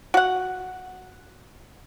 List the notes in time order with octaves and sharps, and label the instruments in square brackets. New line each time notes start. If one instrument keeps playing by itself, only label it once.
[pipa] F#4 F#5